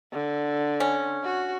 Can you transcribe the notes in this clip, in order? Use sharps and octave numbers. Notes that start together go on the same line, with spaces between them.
D3
C#4
F#4